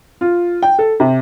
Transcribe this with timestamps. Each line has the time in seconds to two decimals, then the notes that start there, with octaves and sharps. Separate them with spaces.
0.21 F4
0.62 G5
0.79 A4
1.00 C3